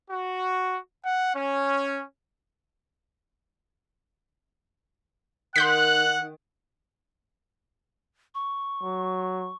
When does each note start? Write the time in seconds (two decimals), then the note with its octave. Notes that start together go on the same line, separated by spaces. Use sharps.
0.11 F#4
1.06 F#5
1.35 C#4
5.56 D#3 F#5 C6 F#6 G6 B6
8.35 C#6
8.82 F#3